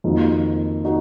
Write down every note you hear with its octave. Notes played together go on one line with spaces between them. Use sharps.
F2 D#3 A#3 D#4 F#4
D#4 F#4